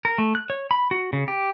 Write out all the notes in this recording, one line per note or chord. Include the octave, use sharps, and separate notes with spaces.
A#4
A3
F#6
C#5
B5
F#4
C#3
G4